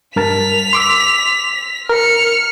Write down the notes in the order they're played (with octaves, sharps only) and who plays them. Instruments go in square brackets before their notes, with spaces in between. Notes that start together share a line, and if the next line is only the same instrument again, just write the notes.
[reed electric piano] G2 A#4 A5 [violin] B6 F7
[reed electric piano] C6 D6 E6
[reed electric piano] A#4 [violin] F6 C#7